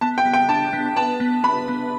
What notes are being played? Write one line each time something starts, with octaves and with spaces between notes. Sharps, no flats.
B3 A5
G5
B3
G5
D4 A5
B3
B4 A5
B3
B3 B5
B3